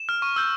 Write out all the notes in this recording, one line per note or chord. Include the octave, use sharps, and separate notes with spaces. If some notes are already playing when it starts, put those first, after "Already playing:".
Already playing: E7
F6
C#6
E6 G6